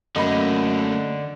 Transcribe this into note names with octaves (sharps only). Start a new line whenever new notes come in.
F#2 D3 A3 A#3 D#5 B5 A#6